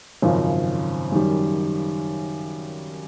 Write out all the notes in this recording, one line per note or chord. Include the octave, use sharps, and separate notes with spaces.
G#1 F#2 C#3 F3
F#2 D#3 G3